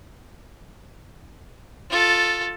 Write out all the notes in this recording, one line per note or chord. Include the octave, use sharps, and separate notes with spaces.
F4 A4